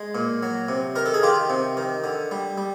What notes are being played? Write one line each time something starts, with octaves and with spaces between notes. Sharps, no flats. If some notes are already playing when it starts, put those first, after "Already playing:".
Already playing: G#3
A#2
F#3
C3
D#3 A#4
A4
G#4
D#3 F4 G4
C3
D#3
D3
G3
G3